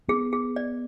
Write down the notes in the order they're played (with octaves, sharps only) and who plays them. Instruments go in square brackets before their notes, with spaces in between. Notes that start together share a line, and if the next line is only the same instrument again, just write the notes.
[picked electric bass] B3 [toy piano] G#4
[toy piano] G#4
D5